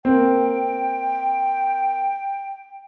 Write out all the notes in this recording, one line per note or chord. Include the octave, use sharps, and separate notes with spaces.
A#3 C4 G5